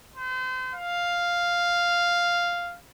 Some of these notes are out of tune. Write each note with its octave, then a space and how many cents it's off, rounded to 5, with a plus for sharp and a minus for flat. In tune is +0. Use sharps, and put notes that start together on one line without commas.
C5 -35
F5 +0